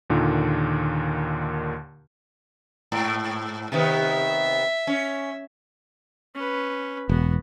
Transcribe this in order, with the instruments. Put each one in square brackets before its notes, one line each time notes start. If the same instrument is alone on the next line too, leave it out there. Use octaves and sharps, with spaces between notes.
[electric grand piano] D#2 A#2 D3 D#3
[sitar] G#2
[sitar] C3 D#3 B3 [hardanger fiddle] E5
[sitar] C#4
[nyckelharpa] C#4 B4
[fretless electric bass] E1 [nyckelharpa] B3 F#4